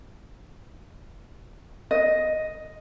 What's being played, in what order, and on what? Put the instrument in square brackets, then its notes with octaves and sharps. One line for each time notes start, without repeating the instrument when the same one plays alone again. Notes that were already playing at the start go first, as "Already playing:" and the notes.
[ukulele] D#5